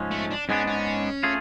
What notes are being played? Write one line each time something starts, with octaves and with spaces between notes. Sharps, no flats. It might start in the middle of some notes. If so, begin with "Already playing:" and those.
Already playing: G#2 F3 G#3 C#4
A3
D4
G#2 G#3 B3 C#4 D4
C#4
A3 F4 G#4